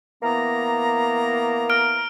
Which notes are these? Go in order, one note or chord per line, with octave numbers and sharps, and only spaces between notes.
E3 A#3 B3 A#5
F6 D7